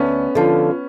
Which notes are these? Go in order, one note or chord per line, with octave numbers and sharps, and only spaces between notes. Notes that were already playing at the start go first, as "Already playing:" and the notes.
Already playing: D2 B3 C#4
D3 F3